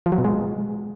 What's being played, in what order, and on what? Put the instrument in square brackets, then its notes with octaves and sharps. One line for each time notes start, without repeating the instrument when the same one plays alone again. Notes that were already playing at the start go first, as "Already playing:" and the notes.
[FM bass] F3
F#3
B2
G#3